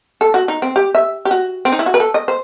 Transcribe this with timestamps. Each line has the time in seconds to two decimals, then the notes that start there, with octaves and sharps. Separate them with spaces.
0.21 A4
0.34 F#4
0.48 D#4
0.62 C4
0.76 G4
0.95 E5
1.25 G4
1.31 F#4
1.65 C4
1.72 D#4
1.79 E4
1.86 F#4
1.94 B4
2.00 A4
2.14 D#5
2.28 C5